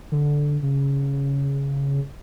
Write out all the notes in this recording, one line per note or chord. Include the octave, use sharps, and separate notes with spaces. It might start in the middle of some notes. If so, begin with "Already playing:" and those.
D3
C#3